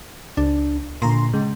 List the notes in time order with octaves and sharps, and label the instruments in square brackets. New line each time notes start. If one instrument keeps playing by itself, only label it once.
[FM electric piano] C#2 [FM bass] D4
[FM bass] A#2 [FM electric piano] D3 A#5 C6
[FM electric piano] C#3 G#3